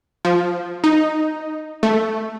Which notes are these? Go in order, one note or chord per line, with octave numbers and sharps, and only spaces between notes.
F3
D#4
A3